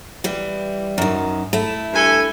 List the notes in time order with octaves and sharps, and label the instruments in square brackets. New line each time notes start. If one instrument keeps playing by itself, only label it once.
[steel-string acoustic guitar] E3 G3
F#2 D#3
A3 E4
[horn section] G2 A4 G#5